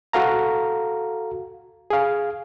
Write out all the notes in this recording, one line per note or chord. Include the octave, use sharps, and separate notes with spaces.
F#4 A4 F5 A#5
G#4 F5